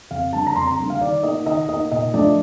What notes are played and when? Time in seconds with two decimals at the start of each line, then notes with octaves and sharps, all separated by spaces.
0.11 F2 F5
0.33 D3 G3 A#3 A5
0.47 A#5
0.56 F2 C6
0.67 A#5
0.79 D3 G3 A#3
0.90 F5
1.01 D#3 D5
1.23 A#3 D#4 D#5
1.46 D#3 D#5
1.68 A#3 D#4 D#5
1.91 A#2 D#5
2.14 F3 A3 D4 D5